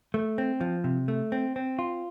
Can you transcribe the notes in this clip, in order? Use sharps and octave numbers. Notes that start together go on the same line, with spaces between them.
A3
C4
F3
C3
A3
C4
C4
F4